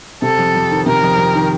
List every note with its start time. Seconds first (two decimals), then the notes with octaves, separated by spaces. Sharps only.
0.22 C3 A4
0.39 F2
0.55 F2
0.71 D#3
0.86 C3 A#4
1.03 F2
1.17 F2
1.35 D#3